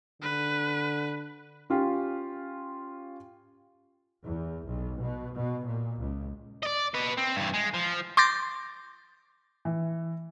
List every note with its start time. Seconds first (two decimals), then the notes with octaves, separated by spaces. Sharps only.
0.22 D3 B4
1.70 C#4 F4 G4
4.24 E2
4.67 B1
5.02 B2
5.35 B2
5.64 A#2
6.00 C#2
6.63 D5 D#5
6.95 B4 D#5
7.18 C4
7.36 G2 E3
7.54 G#3
7.74 F3
8.17 C6 D6 G6 A6 A#6
9.65 E3